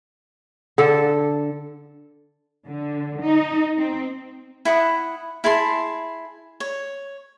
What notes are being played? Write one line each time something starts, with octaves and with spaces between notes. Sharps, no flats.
D3 A4
D3
D#4
C4
E4 F#5 D#6
E4 G#4 A5 C6
C#5